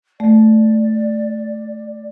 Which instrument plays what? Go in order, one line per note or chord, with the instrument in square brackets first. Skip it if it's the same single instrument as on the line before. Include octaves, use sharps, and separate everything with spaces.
[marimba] A3 [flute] D5